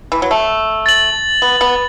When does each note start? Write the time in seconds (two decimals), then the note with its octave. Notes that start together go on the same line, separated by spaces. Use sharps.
0.12 E3
0.22 F#3
0.31 A3
0.86 A6 F#7
1.42 B3
1.61 B3